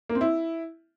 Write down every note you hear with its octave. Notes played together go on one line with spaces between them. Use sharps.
A#3
C4
E4